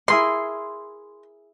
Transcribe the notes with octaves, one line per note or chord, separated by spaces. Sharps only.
E4 G#4 A#4 C6